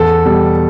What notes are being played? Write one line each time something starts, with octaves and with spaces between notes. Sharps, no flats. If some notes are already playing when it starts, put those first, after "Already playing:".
Already playing: E2 A4
B2 G3